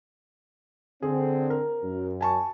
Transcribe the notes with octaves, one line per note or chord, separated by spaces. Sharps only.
D3 C4 G#4
A#4
F#2
G#5 A5 C#6